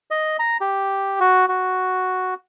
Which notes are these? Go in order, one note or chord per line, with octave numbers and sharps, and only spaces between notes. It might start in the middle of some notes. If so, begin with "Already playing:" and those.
D#5
A#5
G4
F#4
F#4